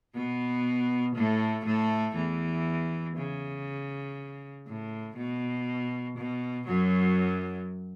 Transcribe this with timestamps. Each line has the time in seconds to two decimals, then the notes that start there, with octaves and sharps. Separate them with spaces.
0.15 B2 B3
1.15 A2 A3
1.65 A2 A3
2.16 E2 E3
3.17 C#3
4.67 A2
5.17 B2
6.17 B2
6.67 F#2 F#3